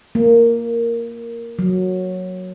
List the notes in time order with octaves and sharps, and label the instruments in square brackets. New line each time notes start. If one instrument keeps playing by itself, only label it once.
[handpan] A#3
F#3